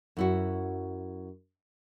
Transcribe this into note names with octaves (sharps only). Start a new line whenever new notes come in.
F#2 E4 F#4